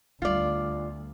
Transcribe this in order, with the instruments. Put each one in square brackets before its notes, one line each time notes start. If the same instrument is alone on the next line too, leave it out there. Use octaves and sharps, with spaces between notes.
[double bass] D2 [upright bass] G3 B3 [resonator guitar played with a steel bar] F4 D5